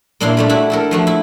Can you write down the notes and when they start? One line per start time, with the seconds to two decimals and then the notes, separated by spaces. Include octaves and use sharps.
0.20 A#2 A#3 D4 E4 F4
0.37 G3 A3 D4
0.49 D4 E4 F#4
0.70 E4 A4 A#4
0.91 F3 A3 F#4
1.07 E4